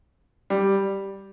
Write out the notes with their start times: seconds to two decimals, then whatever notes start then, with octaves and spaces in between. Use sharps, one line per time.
0.50 G3